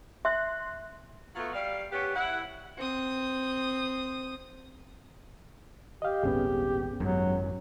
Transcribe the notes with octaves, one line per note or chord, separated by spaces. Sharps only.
E5 C6 F#6
F#3 A3 B3 F4
G3 F5
B3 C#4 G4
E4 F#5
C4 D#6
G4 D#5 F5
D#1 G#1 B3 C#4 G#4
G#1 F#2 F#3